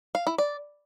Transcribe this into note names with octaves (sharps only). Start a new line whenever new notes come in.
F5
E4
D5